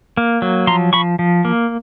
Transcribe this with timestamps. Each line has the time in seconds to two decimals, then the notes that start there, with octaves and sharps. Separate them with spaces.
0.17 A#3
0.42 F#3
0.67 F3 A#5 C6
0.93 F3 B5 C#6
1.19 F3
1.45 A#3